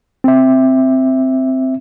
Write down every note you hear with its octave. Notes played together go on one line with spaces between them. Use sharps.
C4 E5